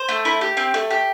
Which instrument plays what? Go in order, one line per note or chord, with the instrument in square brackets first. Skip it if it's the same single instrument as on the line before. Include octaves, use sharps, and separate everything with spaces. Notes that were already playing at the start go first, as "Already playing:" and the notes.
Already playing: [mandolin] C5
A3
E4
G4
C4
A3
G4